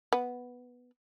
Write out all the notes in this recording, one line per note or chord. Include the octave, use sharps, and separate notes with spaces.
B3